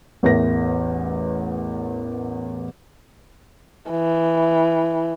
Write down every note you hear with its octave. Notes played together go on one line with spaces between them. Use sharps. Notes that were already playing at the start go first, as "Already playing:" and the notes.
A1 E2 A#4 B4 E5 A#6
E3